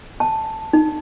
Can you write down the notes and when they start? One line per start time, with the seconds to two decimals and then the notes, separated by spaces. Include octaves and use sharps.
0.20 A5
0.73 D#4